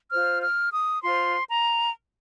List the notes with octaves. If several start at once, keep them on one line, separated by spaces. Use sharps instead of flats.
F4 C5 F6
F6
D#6
F4 C5 C6
A#5